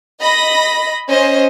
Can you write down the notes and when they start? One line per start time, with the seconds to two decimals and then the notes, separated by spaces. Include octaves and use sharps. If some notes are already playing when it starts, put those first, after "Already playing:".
0.20 D#5 B5 A#6
1.10 C#4 C5 D#5